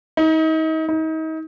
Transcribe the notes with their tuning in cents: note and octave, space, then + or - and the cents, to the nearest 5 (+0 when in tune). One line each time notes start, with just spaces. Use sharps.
D#4 +35
D#4 +35